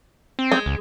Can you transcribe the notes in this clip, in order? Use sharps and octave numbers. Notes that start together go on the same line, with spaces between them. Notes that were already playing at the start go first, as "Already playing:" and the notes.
C4
G#3
C#2